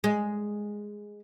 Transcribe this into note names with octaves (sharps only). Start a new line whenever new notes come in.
G#3